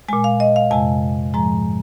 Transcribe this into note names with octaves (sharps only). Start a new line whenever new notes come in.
A#2 G#3 G#5
F5
D#5
F5
F2 C3 G#3 G#5
G#2 F3 G#3 A#5